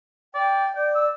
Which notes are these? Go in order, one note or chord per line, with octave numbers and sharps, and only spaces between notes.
D5 G5
D5 G5
E6